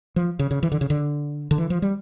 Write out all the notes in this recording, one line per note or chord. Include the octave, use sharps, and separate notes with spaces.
F3
C#3
C#3
E3
D3
C#3
D3
D3
E3
F3
G3